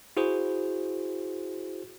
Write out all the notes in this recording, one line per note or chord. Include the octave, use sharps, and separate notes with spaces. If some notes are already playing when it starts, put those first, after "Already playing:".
E4 F#4 G#4 C5